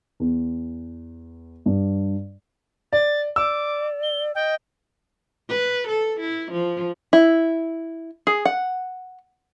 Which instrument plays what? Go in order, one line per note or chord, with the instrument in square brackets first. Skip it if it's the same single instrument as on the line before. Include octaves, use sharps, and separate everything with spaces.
[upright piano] E2
G2
[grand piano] D5 [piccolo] A6
[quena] D5 [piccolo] D6 [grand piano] E6
[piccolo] G7
[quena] D#5 [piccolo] G5
[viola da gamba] B4
A4
E4
F3
[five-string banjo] E4
G#4
F#5